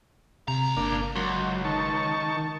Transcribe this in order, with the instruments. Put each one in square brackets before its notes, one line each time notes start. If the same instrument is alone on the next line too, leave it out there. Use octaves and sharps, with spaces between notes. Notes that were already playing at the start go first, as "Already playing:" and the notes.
[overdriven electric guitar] C#2 A#5 [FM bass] C3
[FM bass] G1 [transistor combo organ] A#3 D4
[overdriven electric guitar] C#2 [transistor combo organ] F#3
[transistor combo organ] D#3 A5 C#6